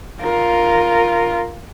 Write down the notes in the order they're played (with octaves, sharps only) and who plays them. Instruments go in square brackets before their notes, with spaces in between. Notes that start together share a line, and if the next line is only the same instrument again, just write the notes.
[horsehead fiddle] F4 A#4